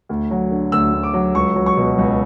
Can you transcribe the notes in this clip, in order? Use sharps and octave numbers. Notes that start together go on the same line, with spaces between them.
D2
F#3
D3
D2 E6
D2
D6
F#3
C#2 C#6
F#3
C#6
B2
C#2